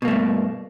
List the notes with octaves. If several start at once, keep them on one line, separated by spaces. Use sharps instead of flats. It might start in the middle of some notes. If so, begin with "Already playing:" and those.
G2 B2 A3 A#3